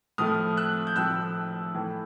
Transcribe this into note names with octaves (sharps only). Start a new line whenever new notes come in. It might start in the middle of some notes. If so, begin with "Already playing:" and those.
A2 F3 A3 D#6 F6
E6 F#6
G6
A2 F3 A3 E6 F#6
A2 E3 A3